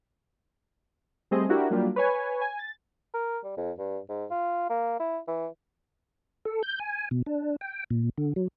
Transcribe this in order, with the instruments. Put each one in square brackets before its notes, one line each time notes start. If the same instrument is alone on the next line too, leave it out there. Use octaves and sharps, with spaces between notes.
[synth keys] G3 A3 C4 G#4 D#5
D4 E4 F#4 G4 A#4
F#3 G3 A#3 D4 F4 G4
B4 C#5 G#5
G#5
A6
[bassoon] A#4
G3
F2
G2
G#2
F4
A#3
E4
E3
[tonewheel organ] A4
G6
G#5
B2
D4
G5
A#2
D3
F#3